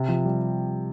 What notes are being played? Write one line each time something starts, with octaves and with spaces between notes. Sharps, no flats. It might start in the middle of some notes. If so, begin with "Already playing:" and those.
Already playing: C3
F3
G3